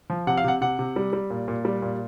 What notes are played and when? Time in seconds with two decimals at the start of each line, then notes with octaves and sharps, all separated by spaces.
0.10 F3
0.27 C3 F#5
0.37 F5
0.44 C3 F#5
0.61 C3 F#5
0.79 C3
0.96 G3
1.13 G3
1.30 A#2
1.48 A#2
1.65 G3
1.82 A#2